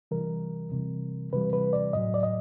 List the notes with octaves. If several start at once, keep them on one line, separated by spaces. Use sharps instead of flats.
C3 E3 G3 A#4
C3 E3 G3
C3 E3 G3 B4
B4
D5
A2 F#3 D#5
D5
D#5